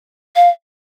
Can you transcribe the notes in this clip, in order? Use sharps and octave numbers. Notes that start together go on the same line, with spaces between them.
F5